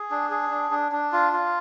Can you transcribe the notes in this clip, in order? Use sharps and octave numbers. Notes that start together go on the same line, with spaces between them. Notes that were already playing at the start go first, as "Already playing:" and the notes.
Already playing: G#4
D4
G#4
D4
D4
D4
F4
F4